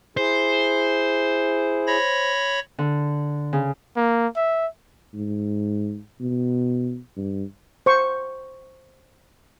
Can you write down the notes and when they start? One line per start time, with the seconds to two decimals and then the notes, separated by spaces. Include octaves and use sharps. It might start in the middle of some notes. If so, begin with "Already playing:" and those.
0.17 E4 G#4 C5
1.87 C#5 B5 A#6
2.79 D3
3.53 C#3
3.96 A#3
4.36 E5
5.13 G#2
6.20 B2
7.16 G2
7.86 C5 C#6